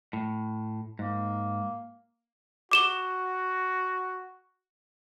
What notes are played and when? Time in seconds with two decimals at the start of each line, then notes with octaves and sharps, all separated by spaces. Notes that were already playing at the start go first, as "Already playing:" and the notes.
0.13 A2
0.99 G#2 A#3
2.71 F#4 D6 E7 G7